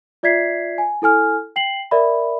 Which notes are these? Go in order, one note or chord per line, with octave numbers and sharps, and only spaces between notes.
F4 D5 E5 G#6 B6 C7
G#5
E4 A4 G#5 F6
G5 C7 F#7
A#4 D5 E5 B5